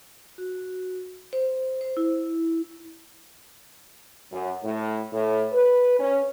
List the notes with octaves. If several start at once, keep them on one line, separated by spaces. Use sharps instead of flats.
F#4
C5
C5
E4
F#2
A2
A2
B4
C#4